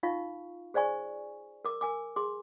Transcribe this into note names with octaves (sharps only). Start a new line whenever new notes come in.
D#4 F4 F5 C#6
G#4 C5 D5 G#5 C#6
A#4 D6
A#4 G#5 D6
G#4 C6 D6